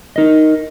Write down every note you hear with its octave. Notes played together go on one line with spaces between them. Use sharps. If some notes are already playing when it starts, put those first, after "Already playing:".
D#4 A#4 D#5